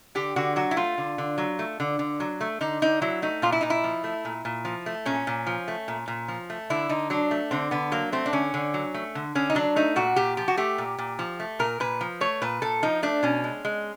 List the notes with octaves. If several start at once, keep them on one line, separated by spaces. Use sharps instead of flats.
D3 G4
D3 F#4
F#3 F#4
E4
A3 F4
D3
D3
F#3
A3
D3
D3
F#3
A3
D3 D#4
D3 D#4
F#3 E4
A3 D#4
A#2 F4
E4
A#2 D#4
E4
F3
A3
A#2
A#2
F3
A3
A#2 C#4
A#2
F3
A3
A#2
A#2
F3
A3
D3 E4
D3 D#4
F#3 D4
A3
D3 C4
D3 B3
F#3 A#3
A3 C4
D4
D3 C#4
D3
F#3
A3
D3
D3 C#4
D#4
F#3 D4
A3 D#4
A#2 F#4
A#2 G4
F3 G4
F#4
A3 G4
A#2
A#2
F3
A3
A#2 A#4
A#2 B4
F3
A3 C#5
A#2 B4
A#2 A4
F3 D#4
A3 D4
B2 C#4
G#3
G#3